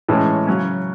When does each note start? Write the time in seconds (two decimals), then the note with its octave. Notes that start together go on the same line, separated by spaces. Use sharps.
0.08 A2 E3 G#3 C#4
0.47 C#3 F#3 C#4